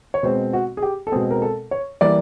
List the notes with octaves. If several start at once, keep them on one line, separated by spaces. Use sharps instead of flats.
C#5
B2 G#3 C4 C5
F#4
G#4
G4
A4
B2 G#3 C4 G#4
A#4
A4
C#5
E3 G3 A#3 D5